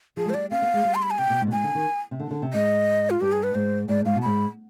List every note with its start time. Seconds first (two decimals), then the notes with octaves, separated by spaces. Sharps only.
0.17 F3 G#4
0.26 G#3
0.29 C5
0.34 G3 D5
0.51 C4 F5
0.62 B3
0.74 G#3
0.85 G3
0.95 C6
1.03 B5
1.11 G#5
1.19 C3 G5
1.30 B2
1.41 G#2
1.47 B2
1.52 G#2 G#5
1.64 D3
1.75 D#3
2.11 C3
2.20 D3
2.31 D3
2.42 C3
2.53 G#2 D#5
3.10 F4
3.21 G2 G4
3.32 G#4
3.43 B4
3.55 G#2 C5
3.88 G#2 D5
4.05 G#2 F5
4.15 B2
4.22 G#2 B5